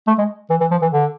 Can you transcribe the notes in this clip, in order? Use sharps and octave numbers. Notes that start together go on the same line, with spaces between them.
A3
G#3
E3
E3
F3
E3
D3